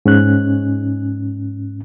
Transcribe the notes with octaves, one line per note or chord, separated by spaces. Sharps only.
G#2 C#4 F#6